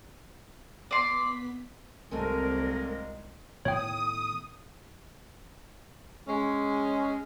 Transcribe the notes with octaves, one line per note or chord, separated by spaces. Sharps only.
B3 D5 C6 B6
C2 A#2 D#3 G#3 A3 C4 A#4 G#5
A2 D#3 B3 C#5 G5 D#6
G#3 C#4